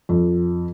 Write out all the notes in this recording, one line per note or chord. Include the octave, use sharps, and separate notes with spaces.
F2